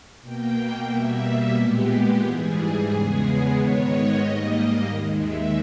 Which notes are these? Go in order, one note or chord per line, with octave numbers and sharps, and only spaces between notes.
B2 A#3 G5
B2 G3 A#3 E5
A#2 G#3 B3 G4
G4
G#2 E3 G3 G#4
E2 C#3 G#3 B3
G#2 D#3 G#3 B3 C#5
D#5
G#2 G3 A#3
D#2 D#3 G#3
E5